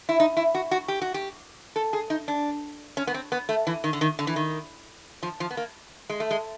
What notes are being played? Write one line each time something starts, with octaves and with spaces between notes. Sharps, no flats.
E4
D#4
E4
F#4
F#4
G4
F#4
G4
A4
G#4
D#4
D4
C#4
B3
C4
B3
A3
E3
D#3
D3
D#3
D3
E3
D#3
F3
F3
B3
A#3
G#3
A3
G#3